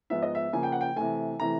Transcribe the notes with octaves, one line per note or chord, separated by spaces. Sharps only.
G#2 F3 G#3 B3 E5
D#5
E5
C#3 F3 A#3 G#5
G5
F#5
G5
C3 E3 A3 G#5
C3 E3 A3 A#5